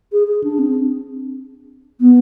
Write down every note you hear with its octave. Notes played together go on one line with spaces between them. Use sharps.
G#4
G#4
D4
C4
B3